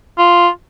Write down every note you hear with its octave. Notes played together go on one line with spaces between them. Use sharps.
F4